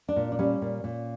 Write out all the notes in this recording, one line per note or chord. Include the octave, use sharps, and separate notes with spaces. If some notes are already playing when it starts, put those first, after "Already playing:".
D4
A#2
D4
G3 C#4
A#2
A#2